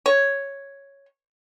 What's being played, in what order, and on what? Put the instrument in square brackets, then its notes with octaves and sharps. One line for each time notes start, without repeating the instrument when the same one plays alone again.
[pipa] C#5